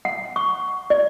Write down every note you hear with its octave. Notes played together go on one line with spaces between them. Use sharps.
F#5
C#6
D5